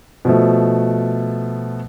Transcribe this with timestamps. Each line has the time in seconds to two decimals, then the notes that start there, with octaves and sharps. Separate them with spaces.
0.25 B2 F3 A3